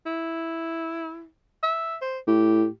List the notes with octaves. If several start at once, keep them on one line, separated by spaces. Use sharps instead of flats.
E4
E5
C5
A2 G4